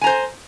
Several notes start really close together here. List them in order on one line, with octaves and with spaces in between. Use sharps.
G#5 A#5 C5